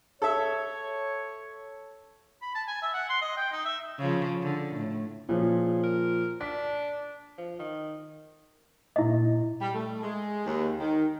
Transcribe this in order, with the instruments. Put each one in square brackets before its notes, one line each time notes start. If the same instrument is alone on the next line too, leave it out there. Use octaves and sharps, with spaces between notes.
[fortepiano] A4 E5 [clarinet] C#5
[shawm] B5
A5
G#5
E5
F#5
C6
D#5
G5
D#4
E5
[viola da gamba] C#3 F3
D3
A2
[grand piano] A#2 F3 [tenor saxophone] C#3
[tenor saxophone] A#4
[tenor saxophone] D4 [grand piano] B6
[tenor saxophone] F3
D#3
[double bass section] A#2 [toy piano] E4 D#5
[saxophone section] G3
A3
G#3
D#2
D#3